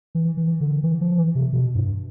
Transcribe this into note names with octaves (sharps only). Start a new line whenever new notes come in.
E3
E3
D3
E3
F3
E3
C3
B2
G2